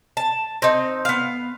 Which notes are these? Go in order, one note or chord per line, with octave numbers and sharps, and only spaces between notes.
A5
C4 D#4
B3 F5